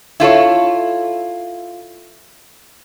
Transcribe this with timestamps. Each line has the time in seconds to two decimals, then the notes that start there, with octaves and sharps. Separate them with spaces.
0.20 E4 F4 A4 C#5